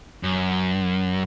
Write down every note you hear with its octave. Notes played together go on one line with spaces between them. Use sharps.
F#2